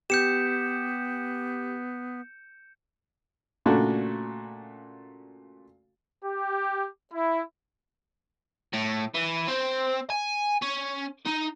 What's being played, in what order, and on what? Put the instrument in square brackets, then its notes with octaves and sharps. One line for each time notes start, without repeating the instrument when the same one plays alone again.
[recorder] B3 [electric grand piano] G4 [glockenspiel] G6 C#7 E7
[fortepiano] A#2 C#3 A3 D4 F#4
[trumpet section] G4
E4
[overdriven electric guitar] A2
E3
C4
G#5
C#4
D#4